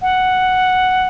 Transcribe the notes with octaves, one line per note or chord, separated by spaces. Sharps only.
F#5